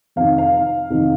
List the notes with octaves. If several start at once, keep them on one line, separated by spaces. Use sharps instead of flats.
F2 C3 D#3 F5
F5
F2 C3 D#3